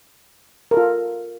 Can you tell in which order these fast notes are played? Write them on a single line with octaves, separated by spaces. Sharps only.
A#4 A4 F4